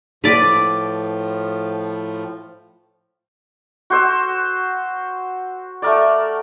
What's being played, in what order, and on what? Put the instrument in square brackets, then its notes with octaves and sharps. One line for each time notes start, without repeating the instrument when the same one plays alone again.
[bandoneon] A2 F3 [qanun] B4 D5
[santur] F#4 C5 E6
A3 A#4 D5